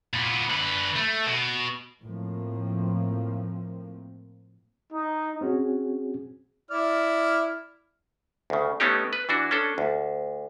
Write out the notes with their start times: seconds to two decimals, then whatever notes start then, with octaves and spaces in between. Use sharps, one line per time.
0.13 A#2 B3
0.50 D3 B4
0.97 A3
1.27 B2
2.03 A2 F3 A#3 C4
4.93 D#4
5.41 C4 C#4 F#4 G#4
6.71 E4 D5 F6
8.50 D2 C#3
8.80 A3 B3 C#4 D#4 G4
9.13 B4
9.29 E3 D4 F#4
9.51 C#4 D4 A4
9.78 D2